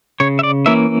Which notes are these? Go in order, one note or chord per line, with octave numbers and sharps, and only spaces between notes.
C#3 C#5
E5
D5
E3 A#3 C#4 E5